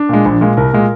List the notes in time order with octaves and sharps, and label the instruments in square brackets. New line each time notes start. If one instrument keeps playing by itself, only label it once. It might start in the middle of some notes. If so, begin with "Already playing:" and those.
Already playing: [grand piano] D4
A#2 G#3
A#1
A#2 G#3
C2 A#4
A#2 G#3